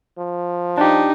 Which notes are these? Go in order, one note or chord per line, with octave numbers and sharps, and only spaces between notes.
F3
D4 D#4 G4